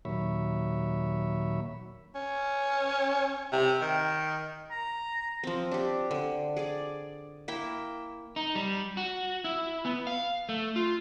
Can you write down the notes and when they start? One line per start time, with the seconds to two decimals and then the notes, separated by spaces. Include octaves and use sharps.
0.05 D#2 A#2 F#3 C#5 E5 B5
2.15 C#4
3.53 C3
3.82 D#3
4.70 A#5
5.44 F3 C4
5.71 D4 G4
6.11 D3
6.57 G#4 D5
7.48 A#3 E4 E5 G5
8.36 D#4
8.55 G3
8.97 F#4
9.44 E4
9.85 B3
10.07 F5
10.49 A3
10.76 F4